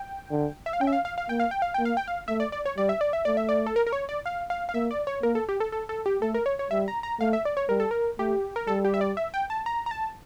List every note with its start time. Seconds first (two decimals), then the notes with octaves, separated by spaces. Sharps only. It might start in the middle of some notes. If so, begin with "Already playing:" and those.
Already playing: G5
0.32 D3
0.66 E5
0.73 F5
0.81 C#4 G5
0.87 E5
0.93 F5
1.05 F5
1.18 F5
1.29 A#3 G5
1.40 F5
1.51 G5
1.62 F5
1.74 A#3 G5
1.85 F5
1.97 G5
2.08 F5
2.28 A3 E5
2.40 D5
2.52 D5
2.65 C#5
2.77 G3 D5
2.89 E5
3.01 D5
3.13 E5
3.25 A3 D5
3.37 E5
3.49 D5
3.67 A4
3.76 A#4
3.87 A#4
3.93 C#5
4.09 D5
4.26 F5
4.50 F5
4.69 F5
4.74 A#3 E5
4.91 D5
5.07 C#5
5.23 A#3 A#4
5.35 A4
5.49 G4
5.60 A4
5.72 A4
5.89 A4
6.06 G4
6.22 A3 A4
6.34 A#4
6.46 C#5
6.59 C#5
6.71 G3 E5
6.88 A#5
7.03 A#5
7.20 A3 F5
7.33 E5
7.45 D5
7.57 C#5
7.69 G3 A#4
7.80 A4
7.91 A#4
8.19 A3 G4
8.56 A#4
8.67 G3 A4
8.85 G4
8.94 E5
9.01 D5
9.17 E5
9.34 G5
9.50 A5
9.66 A#5
9.86 A#5
9.91 A5